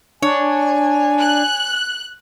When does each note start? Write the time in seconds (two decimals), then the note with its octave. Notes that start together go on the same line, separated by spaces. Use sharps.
0.22 D4 C#5 G#5
1.18 F#6